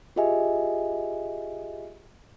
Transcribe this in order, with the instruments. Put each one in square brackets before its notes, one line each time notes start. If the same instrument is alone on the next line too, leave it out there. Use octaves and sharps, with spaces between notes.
[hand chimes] F4 G4 G#4 D#5 E5 G#5